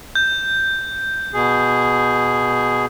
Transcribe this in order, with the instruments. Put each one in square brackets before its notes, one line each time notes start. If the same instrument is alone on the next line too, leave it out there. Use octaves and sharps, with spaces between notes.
[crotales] G6
[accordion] B2 G#4